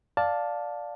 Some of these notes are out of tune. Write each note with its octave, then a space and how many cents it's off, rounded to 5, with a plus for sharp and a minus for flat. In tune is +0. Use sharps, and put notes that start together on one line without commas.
D5 +0 F5 +15 A5 +0